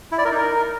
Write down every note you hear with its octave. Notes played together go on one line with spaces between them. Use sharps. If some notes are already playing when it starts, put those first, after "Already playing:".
E4
D5
A#4
D#4
A#4